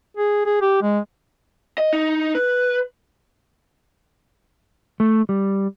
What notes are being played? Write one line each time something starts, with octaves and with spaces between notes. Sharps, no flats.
G#4
G#4
G4
G#3
D#5
D#4
B4
A3
G3